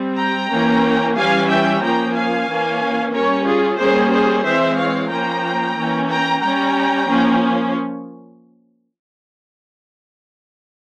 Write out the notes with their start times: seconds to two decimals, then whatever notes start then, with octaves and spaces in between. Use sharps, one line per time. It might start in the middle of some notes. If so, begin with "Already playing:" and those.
Already playing: G3 C4
0.17 G5 A#5
0.50 E3 A#3 C#4
1.16 E3 G3 C#4 F5 G#5
1.48 E5 G5
1.81 F3 A#3 C#4 G5 A#5
2.14 F5 G#5
2.48 E3 A#3 C#4
3.13 G3 C#4 A#4 C#5
3.46 F4 G#4
3.78 G3 A#3 C#4 G#4 C5
4.11 G#4 C5
4.44 E3 G#3 C4 C5 E5
4.77 C#5 F5
5.10 F3 A#3 C#4 G5 A#5
5.76 E3 A#3 C#4
6.09 G5 A#5
6.42 G3 C#4 G5 A#5
7.07 F3 A#3 C#4